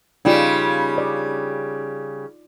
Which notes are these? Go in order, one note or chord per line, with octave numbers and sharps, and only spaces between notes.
C#3 G3 D#4 F4
D5